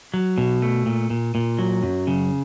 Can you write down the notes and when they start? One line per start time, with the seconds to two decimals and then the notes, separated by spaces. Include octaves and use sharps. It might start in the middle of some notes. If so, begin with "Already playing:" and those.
0.14 F#3
0.38 B2
0.62 A3
0.86 A#2
1.10 A#2
1.35 A#2
1.59 F#3
1.83 F#2
2.07 C#3